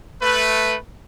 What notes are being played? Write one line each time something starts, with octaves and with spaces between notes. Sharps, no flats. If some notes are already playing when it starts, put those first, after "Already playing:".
A3 B4